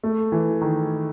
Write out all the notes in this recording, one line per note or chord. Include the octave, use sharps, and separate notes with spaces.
A3
E3
D#3